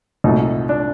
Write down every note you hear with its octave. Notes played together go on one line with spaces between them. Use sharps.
C2 A#2 F#3 A3 D#4
D4